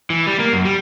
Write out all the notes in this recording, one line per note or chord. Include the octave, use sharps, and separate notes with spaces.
E3
G3
A#3
F#2
G3